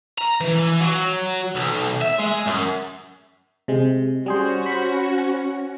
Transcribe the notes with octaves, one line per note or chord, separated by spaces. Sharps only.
A#5
E3
F#3
B1
E5
G#3
F#2
C3 G#3
G3 C#4 F#4 G#4 C5
C5 B5